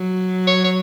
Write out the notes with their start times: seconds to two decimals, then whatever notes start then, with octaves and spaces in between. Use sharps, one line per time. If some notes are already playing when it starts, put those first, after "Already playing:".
Already playing: F#3
0.47 C#5
0.64 C#5